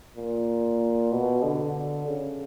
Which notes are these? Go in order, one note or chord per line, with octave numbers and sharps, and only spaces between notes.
A#2
B2
D3
C#3